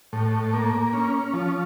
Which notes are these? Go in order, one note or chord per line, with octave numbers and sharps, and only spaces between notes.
A2
A#3
C#4
F3